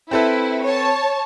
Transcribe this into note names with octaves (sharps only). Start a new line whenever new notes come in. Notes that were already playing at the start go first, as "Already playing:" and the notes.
C4 E4 A4 B4
C#5 A5